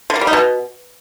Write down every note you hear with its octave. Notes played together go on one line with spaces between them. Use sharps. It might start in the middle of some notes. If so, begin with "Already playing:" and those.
D3
A#3
G3
D#4
B2